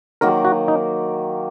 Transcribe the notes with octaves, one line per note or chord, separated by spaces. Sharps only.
D#3 F#3 A#3 A#4
F#4
D#4